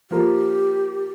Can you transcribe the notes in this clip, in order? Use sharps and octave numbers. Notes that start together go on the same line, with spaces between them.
F3 A#3 F4 G4 A#4